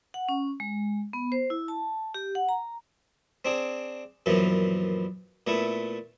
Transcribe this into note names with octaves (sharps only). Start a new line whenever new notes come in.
F#5
C#4
G#3
B3
C5
E4
A5
G4
F#5
A#5
C4 D4 G#4
F#2 A#2 E3 F3 B3
A#2 A3 B3 E4